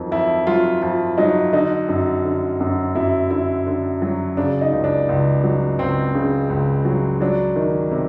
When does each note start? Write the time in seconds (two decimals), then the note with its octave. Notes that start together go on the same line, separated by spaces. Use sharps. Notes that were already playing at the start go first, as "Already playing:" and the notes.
Already playing: F2 D#3 F#3
0.11 F2 E4
0.47 F#3 F4
0.82 F2 F4
1.18 F#3 D#4
1.53 D3 D#4
1.89 F#2
2.25 D3
2.60 F#2
2.95 F#2 E4
3.30 D3 E4
3.67 D3
4.02 F#3
4.37 C#3 D4
4.61 D#4
4.72 C#2
4.84 D4
5.09 C#2
5.44 F#3
5.78 C#2 C4
6.15 C#3
6.49 C#2
6.85 F#3
7.21 F#3 D4
7.56 D#3
7.91 C3